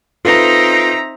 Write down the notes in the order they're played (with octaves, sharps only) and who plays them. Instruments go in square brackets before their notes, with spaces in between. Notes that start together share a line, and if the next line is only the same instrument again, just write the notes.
[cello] C4 D#4 [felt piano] F4 A4 B4 [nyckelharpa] E5 A#5